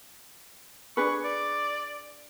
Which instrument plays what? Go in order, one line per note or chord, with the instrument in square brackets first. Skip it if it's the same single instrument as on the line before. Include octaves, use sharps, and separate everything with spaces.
[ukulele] D4 G#4 B4 [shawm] C#6
[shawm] D5